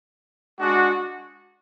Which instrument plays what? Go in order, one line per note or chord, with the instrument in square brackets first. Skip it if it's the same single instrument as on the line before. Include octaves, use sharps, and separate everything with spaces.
[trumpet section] G#3 D4 F#4